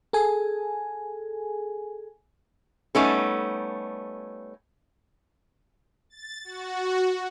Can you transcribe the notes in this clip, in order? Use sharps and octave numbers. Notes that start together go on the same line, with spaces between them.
G#4 A4 G#5
G3 A3 B3 C#4 D#4 A4
A6
F#4